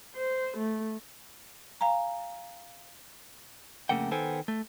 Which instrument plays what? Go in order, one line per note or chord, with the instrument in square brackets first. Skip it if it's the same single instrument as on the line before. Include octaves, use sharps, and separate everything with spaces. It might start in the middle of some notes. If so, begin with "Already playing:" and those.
[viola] C5
A3
[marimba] F5 G#5 A#5
[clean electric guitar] F2 C#3 A3 A#3 F#5 G5
D#3 B3 A4 C5 G5 G#5
A3